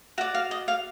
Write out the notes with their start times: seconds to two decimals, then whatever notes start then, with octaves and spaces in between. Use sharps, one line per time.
0.18 F#4 F5
0.21 D5
0.35 F5
0.51 D#5
0.68 F5